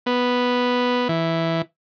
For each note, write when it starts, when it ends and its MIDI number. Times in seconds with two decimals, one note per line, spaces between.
0.06 1.08 59
1.09 1.62 52